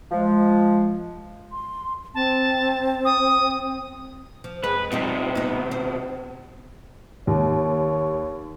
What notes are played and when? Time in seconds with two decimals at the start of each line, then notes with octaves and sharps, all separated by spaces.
0.11 F3 G#3
1.51 C6
2.15 C4 A5
3.05 D#6
4.44 F3
4.64 F2 G#3 B4
4.92 B2 G3 C4 D#4 F4
5.35 B3 D#4
5.71 C5
7.27 D#2 C#5